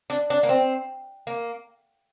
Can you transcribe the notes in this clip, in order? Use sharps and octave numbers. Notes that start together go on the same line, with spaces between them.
D4
D4
A#3
C4
A#3